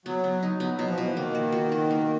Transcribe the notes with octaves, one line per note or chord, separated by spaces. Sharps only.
F#3 B3
B3
D#4
F#3 B3
B2 F#3
F3
B2 E3
D#3 A#3
F#4
F#4
F#4
A#3